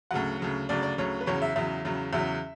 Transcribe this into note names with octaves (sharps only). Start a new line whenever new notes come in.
D2 C#3 F#3 F#5
D2 C#3 F#3
D2 C#3 F#3 D5
D5
D2 C#3 F#3 C#5
B4
E2 C#3 F#3 C#5
E5
E2 C#3 F#3 E5
E2 C#3 F#3
E2 C#3 F#3 E5